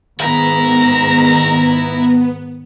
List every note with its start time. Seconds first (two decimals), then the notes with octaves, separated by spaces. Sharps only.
0.20 G#2 D#3 B3 E4 A#5